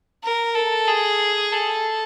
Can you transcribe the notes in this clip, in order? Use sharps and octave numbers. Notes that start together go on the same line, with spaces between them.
A#4
A4
G#4
A4